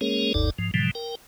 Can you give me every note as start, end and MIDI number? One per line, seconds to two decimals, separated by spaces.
0.01 0.33 56
0.01 0.33 58
0.01 0.33 61
0.01 0.33 68
0.01 0.33 70
0.01 0.33 73
0.34 0.50 30
0.34 0.50 38
0.34 0.50 43
0.34 0.50 63
0.34 0.50 69
0.34 0.50 74
0.58 0.71 44
0.58 0.71 53
0.74 0.91 44
0.74 0.91 47
0.74 0.91 50
0.74 0.91 52
0.74 0.91 53
0.74 0.91 55
0.95 1.15 70
0.95 1.15 79